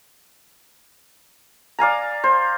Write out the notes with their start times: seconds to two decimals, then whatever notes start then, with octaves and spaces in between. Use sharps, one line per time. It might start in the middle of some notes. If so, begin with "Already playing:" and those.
1.79 D5 F5 G#5 A#5
2.24 C5